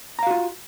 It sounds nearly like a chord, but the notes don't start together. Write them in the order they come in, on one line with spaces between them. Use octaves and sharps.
A#5 F5 F#4 F4